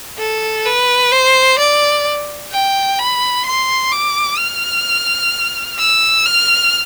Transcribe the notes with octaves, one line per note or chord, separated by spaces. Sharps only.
A4
B4
C5
D5
G5
B5
C6
D6
F6
E6
F6